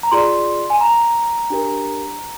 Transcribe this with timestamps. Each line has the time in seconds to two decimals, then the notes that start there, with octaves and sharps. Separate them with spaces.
0.03 A#5
0.11 F4 G#4 D5 C6
0.70 G#5
0.81 A#5
1.50 D4 G4 A#4